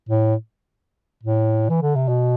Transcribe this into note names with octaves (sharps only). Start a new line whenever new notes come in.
A2
A2
E3
D3
C3
B2